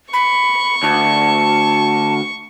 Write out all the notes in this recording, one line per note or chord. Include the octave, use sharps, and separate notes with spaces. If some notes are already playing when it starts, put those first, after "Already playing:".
B5 C#6
D2 A5